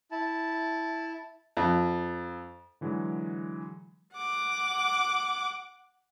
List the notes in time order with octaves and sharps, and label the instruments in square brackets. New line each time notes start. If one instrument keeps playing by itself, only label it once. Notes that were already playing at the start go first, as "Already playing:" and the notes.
[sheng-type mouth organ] E4 A5
[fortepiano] F2
[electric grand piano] D3 E3 F#3 G#3
[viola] F#5 D6